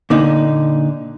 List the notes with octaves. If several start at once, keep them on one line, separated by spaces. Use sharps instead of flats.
A#2 D3 D#4